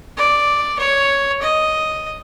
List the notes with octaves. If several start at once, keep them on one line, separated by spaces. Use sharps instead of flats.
D5
C#5
D#5